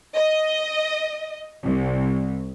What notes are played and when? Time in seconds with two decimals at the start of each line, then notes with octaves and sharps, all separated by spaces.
0.15 D#5
1.64 C2